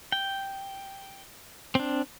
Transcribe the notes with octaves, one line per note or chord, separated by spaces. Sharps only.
G5
C4 D4